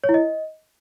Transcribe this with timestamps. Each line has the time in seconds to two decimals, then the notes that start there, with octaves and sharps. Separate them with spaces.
0.04 C#5
0.09 E4
0.14 D#5